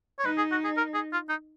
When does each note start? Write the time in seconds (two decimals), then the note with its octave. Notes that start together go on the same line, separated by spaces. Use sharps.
0.19 C#5
0.25 D#4 B4
0.38 G#4
0.51 F#4
0.64 G#4
0.77 A#4
0.94 G#4
1.13 F4
1.29 D#4